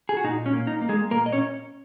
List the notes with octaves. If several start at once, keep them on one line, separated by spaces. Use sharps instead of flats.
G#4
F#4
A#2 D#4
C#4
A#3
D#4
A#3
G#3 G#4
A#2 A#3 A#4
D#5
C#4 C#5